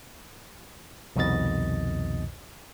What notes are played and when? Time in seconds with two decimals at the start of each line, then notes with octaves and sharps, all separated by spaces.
1.16 C2 F2 B2 D#3 D#5 A6